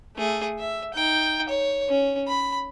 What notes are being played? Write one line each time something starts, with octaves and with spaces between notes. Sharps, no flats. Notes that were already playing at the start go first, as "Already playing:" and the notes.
A3 G#4
E5
D#4 G5
C#5
C#4
B5